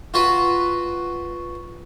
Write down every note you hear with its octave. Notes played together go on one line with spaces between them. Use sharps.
F4 F#4 B4